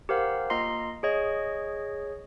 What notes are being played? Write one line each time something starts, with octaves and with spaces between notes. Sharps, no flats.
G4 A#4 C5 F5 F#5
A#3 F4 D#5 A#5 C6 C7
G#4 C#5 D#5